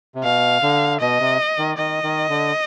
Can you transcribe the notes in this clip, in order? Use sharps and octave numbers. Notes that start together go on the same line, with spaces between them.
C3
B2 F5
D3
B2 D#5
C3
D#3
D#3 D#5
D#3
D3